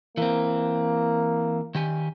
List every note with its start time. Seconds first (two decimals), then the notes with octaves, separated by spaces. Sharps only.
0.17 E3 A#3 C4
1.75 D#3 G4 G#5